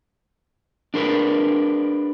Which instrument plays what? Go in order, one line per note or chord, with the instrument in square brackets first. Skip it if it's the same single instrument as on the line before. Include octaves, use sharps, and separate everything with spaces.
[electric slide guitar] D4 G#4 A#4 B4